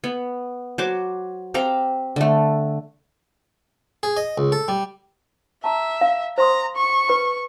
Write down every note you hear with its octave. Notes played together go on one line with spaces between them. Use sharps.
B3
F#3 C5 D6
C4 G4 F5 A#5
D3 A3
G#4
D#5
C#2
A4
G3
E5 A5 A#5
F5
C5 A#5 C6 D#6
C#6
B4 B5